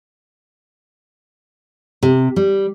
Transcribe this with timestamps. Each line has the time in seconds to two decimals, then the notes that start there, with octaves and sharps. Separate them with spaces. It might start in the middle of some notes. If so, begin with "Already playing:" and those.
2.03 C3
2.36 G3